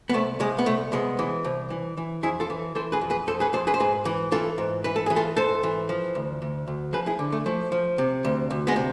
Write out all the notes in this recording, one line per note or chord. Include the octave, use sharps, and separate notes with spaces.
B3
C2 A3
C2 G#3
B3
C2 A3
C2 G#3 B3
E3
C2
E3
E3
F2 E4 G#4
F4 A4
E3
E3 A4 C5
G#4 B4
F2
G#4 B4
F2 A4 C5
G#4 B4
F2 A4 C5
G#4 B4
C5
G#2 G#4 B4
E3
E3 F4 A4
G#2
E3 B4
A4
E3 G#4
F4 A4
G#2 A4 C5
E3
F3
D2
D2
D2
F3 G#4 B4
E4 G#4
D3
A3
F3 A3
F3
C3
D2
D2
G#3 B3
C3